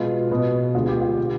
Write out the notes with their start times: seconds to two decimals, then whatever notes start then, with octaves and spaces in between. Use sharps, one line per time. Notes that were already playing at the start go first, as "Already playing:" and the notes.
Already playing: B2 G#3 B3 F4
0.31 B2 B3
0.74 D2 D3 G#3 B3 F4
0.89 G4
1.01 F4
1.18 B2 B3